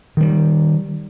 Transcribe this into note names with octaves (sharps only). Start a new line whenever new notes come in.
D#3 G3